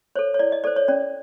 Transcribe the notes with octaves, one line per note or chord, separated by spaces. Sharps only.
A4 C5 C#5
C#5
E4 D5
D#5
A4 C5 D5
C#5
C#4 D5